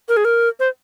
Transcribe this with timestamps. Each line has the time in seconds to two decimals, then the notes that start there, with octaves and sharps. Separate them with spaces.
0.08 A#4
0.17 G#4
0.25 A#4
0.60 C5